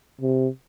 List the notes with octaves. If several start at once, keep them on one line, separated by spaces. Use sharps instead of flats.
C3